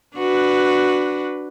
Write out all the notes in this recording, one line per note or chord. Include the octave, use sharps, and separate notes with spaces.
D4 F#4 B4